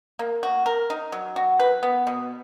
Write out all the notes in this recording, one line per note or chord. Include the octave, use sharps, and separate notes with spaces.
A#3
F#4
A#4
D#4
F#3
F#4
B4
B3
B2